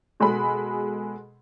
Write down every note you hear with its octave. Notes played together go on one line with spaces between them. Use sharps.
B2 G#3 G#4 A4 B5